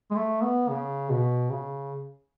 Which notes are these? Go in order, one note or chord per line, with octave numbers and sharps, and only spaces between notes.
G#3
A3
B3
C#3
B2
C#3